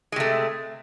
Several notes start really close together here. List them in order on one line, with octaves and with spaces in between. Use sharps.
G#3 C3 A3